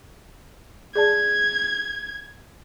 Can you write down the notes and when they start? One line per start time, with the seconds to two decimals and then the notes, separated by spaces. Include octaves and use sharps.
0.95 G#4 D5 A5 G#6